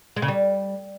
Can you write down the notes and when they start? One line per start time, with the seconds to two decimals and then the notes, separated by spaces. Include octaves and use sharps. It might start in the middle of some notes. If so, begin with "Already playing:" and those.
0.16 G#3
0.22 C#3
0.28 G3